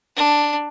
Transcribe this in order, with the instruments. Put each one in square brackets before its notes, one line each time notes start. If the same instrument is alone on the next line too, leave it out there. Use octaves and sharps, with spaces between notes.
[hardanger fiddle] D4